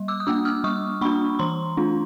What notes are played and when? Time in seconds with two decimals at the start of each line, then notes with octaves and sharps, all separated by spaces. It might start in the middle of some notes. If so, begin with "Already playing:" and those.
Already playing: G3
0.08 D6 E6
0.20 D#6
0.27 A#3 D4 D6 E6
0.45 D#6 F6
0.64 G3 C#6 D#6
1.01 A#3 D4 B5 C#6
1.39 E3 A#5 C6
1.77 A3 D4 F4